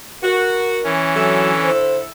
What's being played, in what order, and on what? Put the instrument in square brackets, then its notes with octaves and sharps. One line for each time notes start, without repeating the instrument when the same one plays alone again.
[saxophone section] F#4 [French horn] A#4
[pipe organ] E3 C#4
[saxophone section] D3 E4 A4 [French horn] F#3
[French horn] C5